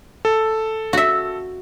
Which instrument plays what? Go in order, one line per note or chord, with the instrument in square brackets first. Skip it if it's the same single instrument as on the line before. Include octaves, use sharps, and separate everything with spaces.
[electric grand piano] A4
[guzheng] F#4 E5